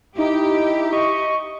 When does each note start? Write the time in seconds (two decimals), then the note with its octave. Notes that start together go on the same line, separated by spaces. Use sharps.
0.18 D#4 E4 G4
0.93 D#5 C#6